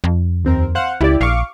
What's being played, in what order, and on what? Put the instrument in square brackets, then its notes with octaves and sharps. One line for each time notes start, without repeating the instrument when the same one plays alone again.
[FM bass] F2
[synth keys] D#2 C4 A#4
C5 F5 F#5
[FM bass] C#2 [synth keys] E4 G4 D5
[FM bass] A#1 [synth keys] F5 C#6 D6